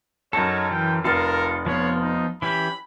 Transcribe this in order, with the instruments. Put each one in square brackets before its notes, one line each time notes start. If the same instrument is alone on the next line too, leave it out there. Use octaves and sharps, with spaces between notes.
[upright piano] F#2 A5 [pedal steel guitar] D#4 F#4 A4 [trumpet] C#5
[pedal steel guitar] E3 [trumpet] G5
[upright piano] F1 F6 A6 [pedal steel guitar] F4 A4 [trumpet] A#4
[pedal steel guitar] F3 B3 F4 [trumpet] C#5
[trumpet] D#4
[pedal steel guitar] E3 C#4 G4 [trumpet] B5